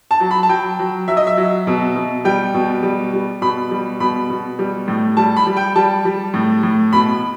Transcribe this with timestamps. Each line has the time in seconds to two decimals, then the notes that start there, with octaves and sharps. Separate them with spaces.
0.11 A5
0.20 F#3
0.31 B5
0.43 A5
0.49 F#3 G5
0.79 F#3
1.08 F#3 E5
1.17 D#5
1.27 E5
1.37 F#3
1.67 B2
1.96 B2
2.25 G3 G5
2.54 B2
2.83 G3
3.13 G3
3.42 B2 B5
3.71 G3
4.00 B2 B5
4.30 B2
4.59 G3
4.88 A2
5.17 G3 A5
5.36 B5
5.47 G3
5.57 G5
5.76 G3 A5
6.05 G3
6.34 A2
6.63 A2
6.93 B2 B5